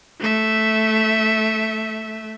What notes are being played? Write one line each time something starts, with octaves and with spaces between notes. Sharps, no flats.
A3 E5